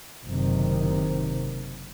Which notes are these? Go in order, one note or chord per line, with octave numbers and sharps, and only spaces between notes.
F#1 C3 D#3